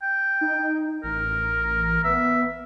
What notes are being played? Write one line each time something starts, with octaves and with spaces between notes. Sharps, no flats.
G5
D#4
A1 A#4
B3 E5